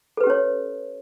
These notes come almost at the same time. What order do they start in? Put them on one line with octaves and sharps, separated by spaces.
A4 B4 G4 C#4 C#5